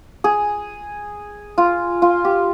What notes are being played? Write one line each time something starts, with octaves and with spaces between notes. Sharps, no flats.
G#4
F4
F4
G4